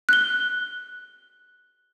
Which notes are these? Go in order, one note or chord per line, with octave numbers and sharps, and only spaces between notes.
F#6 G7